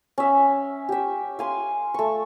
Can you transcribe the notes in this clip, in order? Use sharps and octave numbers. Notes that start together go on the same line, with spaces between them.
C#4 E5
G4 E5
F5 G#5 C6
A3 C#6